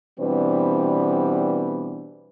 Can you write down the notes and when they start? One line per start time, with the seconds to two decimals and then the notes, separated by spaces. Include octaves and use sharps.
0.20 B2 E3 G3 B3 C4 D4